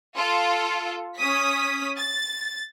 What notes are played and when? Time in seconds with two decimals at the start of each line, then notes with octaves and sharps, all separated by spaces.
0.17 F4 A4
1.17 C#4 D#6 B6
1.98 A6